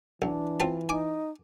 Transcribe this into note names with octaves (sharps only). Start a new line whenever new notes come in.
B1 E3 D4
C4 F4 A5
D#4 G#5 D6